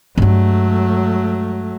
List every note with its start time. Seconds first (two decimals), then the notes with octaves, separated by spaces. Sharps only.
0.18 G2 F#3 G#3 A3